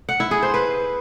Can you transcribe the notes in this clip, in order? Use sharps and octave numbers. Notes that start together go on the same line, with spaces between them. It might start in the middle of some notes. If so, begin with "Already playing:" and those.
F#5
E4
G#4
C5
B4